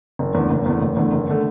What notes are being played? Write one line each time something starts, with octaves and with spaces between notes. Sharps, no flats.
F#1
E2 D3 A3
F#1
E2 D3 A3
F#1
E2 D3 A3
F#1
D3 A3